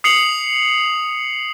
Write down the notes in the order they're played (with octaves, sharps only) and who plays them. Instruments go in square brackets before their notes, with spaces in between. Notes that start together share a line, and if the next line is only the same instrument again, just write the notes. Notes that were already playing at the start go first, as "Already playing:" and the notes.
[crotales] D#6 C7 C#7 F7 F#7